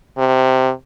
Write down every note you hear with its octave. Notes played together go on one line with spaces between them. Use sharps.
C3